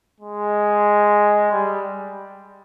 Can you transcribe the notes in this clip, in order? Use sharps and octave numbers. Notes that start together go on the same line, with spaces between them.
G#3
G3